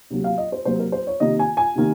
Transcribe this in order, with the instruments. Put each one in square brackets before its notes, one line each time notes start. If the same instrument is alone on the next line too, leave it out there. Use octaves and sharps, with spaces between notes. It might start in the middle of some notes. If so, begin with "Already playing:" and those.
[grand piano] C3 F#3 A#3
F5
D#5
C5
C3 F#3 A#3 C5
A#4
C5
C#5
C3 D#3 A#3 D#5
G#5
G#5
C3 D#3 A#3